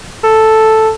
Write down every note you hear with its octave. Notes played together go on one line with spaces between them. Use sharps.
A4